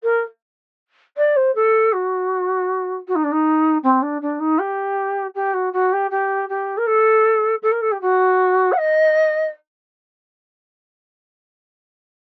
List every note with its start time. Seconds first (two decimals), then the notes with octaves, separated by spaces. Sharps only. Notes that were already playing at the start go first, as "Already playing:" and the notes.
0.03 A#4
1.17 D5
1.36 C5
1.55 A4
1.92 F#4
3.07 F#4
3.15 D#4
3.24 D4
3.32 D#4
3.83 C4
4.02 D4
4.21 D4
4.40 D#4
4.58 G4
5.35 G4
5.53 F#4
5.73 F#4
5.92 G4
6.11 G4
6.49 G4
6.77 A#4
6.87 A4
7.62 A4
7.72 A#4
7.81 A4
7.91 G4
8.01 F#4
8.72 F#5
8.77 D#5